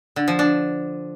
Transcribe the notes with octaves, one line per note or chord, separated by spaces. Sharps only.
D3
F3
D4